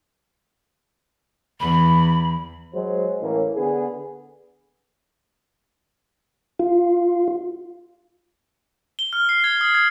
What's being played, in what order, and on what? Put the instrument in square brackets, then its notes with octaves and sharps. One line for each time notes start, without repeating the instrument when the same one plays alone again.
[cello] E2 [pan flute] B5
[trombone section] F#3 G#3 C5
A2 E3 A#3 C#4
D3 B3 G#4
[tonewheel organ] F4
[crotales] G7
F6
C7
G#6
D#6
G#6